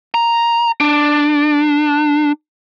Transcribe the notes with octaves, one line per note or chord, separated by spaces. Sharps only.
A#5
D4